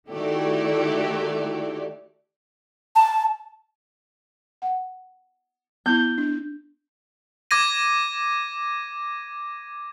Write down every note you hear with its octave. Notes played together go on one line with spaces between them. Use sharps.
D#3 A3 E4 F#4 G4 D5
A5
F#5
B3 E4 G6
D4
D6 G#6 A#6 D#7